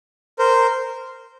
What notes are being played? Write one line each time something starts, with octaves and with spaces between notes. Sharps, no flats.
A#4 C5